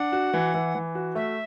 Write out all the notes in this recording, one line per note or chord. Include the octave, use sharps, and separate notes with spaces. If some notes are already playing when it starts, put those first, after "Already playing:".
Already playing: D4 F#5
F#4
E3
E3
E3
F#4
A3 E5